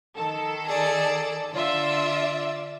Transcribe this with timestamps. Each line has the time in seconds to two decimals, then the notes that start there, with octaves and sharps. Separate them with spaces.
0.16 D#3 A4
0.65 G#4 D5
1.52 D3 F4 D5 E5